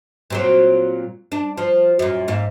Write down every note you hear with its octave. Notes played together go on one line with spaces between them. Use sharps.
A#2 F#3 C4
D4
F3
F#2 A#2
G#2 A#3